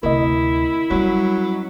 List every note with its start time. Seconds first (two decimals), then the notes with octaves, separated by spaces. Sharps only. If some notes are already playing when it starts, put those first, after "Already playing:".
0.03 D2 C3 E4 A#4 D#5
0.91 F#3 G3 C#4